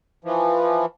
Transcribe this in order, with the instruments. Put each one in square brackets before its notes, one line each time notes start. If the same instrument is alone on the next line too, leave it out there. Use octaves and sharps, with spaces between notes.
[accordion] E3 F3